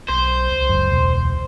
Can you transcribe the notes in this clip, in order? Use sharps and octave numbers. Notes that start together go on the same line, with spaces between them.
B1 C5
C#2
F#1 F#2
E1